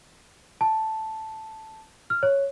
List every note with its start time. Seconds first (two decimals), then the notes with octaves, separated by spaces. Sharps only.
0.61 A5
2.10 F6
2.23 C#5